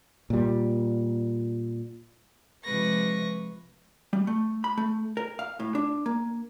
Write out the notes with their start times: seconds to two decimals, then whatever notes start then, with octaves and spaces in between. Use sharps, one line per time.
0.30 A#2 G3
2.63 C3 F3 G#3 B4 C#6 A#6
4.13 G3
4.27 A3
4.64 B5
4.77 A3
5.17 A#4
5.39 F5
5.60 A2
5.75 D4
6.06 A#3